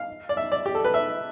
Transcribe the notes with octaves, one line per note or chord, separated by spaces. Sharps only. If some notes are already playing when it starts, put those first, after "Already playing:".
Already playing: F5
D5
E5
D5
G4
A4
B4
E5